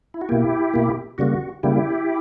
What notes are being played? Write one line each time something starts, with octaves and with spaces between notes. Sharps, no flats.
E4
F#4
B2 A#3 E4 G4
B2 A#3
C#3 G3 A#3 F#4
C#3 G3 A#3 E4 G4